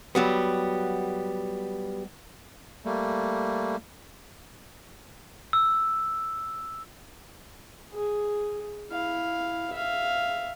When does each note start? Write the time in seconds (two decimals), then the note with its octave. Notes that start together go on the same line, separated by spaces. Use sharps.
0.15 F#3 G3 B3
2.85 G3 A3 A#3
5.53 E6
7.93 G#4
8.90 E4 F5
9.73 E5 F5